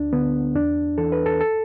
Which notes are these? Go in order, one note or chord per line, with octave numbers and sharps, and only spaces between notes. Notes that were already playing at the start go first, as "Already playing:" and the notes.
Already playing: D2 D4
D3 B3
E2 D4
E3 A4
B4
A4
A4